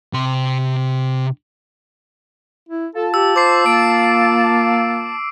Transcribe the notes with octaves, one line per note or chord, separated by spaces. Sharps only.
C3 C6
E4
F4 A4 A5
G4 E6
C5 D6 C7
A#3 D7